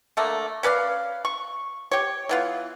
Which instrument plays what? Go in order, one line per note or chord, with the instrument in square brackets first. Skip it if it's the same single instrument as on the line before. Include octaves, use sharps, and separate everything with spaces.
[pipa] D3 A3 A#3
C#4 B4 D5 F5
C#6
G4 C#5
E3 B3 F4